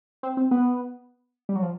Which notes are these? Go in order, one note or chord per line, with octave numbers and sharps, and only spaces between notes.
C4
C4
B3
G3
F#3
F3